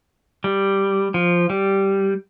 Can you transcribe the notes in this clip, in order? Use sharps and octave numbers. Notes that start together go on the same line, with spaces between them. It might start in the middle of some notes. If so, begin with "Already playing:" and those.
G3
F3
G3